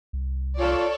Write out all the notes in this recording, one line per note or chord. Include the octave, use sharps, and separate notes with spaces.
C2
F4 A4 C#5 D5